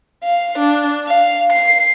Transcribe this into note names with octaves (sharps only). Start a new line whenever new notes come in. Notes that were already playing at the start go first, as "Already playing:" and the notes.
F5
D4
F5
C7